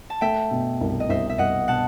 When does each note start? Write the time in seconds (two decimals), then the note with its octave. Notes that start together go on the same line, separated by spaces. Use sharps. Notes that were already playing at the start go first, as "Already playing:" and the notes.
0.10 A5
0.21 A3 E5 G5
0.51 B2
0.81 C2
1.00 D#5
1.09 C2 C5 E5
1.30 E5
1.38 C2 D#5 F#5
1.68 B2 F#5 A5